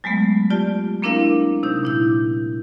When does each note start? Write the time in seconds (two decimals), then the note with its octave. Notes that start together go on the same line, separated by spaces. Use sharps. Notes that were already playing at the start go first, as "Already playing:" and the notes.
0.04 F#3 G#3 A3 B3
0.50 F4 G4 D5 A5
1.02 A#3 C4 D4 E4 A#4 F5
1.63 C3 D#4 G6
1.83 A#2 E4 G6